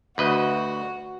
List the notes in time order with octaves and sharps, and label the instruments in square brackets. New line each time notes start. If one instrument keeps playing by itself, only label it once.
[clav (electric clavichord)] D2 B4 D#5 [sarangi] F#4